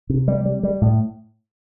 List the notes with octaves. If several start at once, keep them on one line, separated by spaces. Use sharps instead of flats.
C3
G3
G3
G3
A2